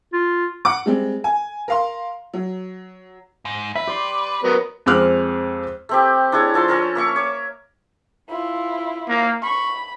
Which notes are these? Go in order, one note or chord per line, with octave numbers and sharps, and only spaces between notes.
F4
F#5 D6
G3 G#3 C4
G#5
A#4 F5 C6
F#3
G#2
B4 E5
G4 D5 C6
F#3 B3 A#4
F2 G#3 C4 D6 F6 F#6
A3 C4 G4
D4 E4 G#4 C#5
F3 A4 A5 C6
C#4 A4 A#4
A#3 E5 C#6 D6
C#5 D6
E4 F4
A#3
B5 C#6